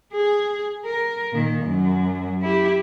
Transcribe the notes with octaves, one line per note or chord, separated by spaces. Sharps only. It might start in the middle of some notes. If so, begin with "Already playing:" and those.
G#4
A#4
A#2 D#3
F#2 F#3
E4 G4